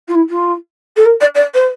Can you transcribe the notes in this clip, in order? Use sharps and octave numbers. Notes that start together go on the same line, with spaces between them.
F4
E4
F4
A4
A#4
D5
D5
C5